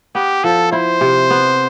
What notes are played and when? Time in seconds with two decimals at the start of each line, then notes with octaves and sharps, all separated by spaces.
0.15 B3 G4
0.44 F3 A4
0.72 E4 C5
1.01 C3
1.30 B3